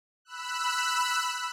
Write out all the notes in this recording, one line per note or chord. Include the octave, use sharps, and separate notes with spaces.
B5 E6 F#6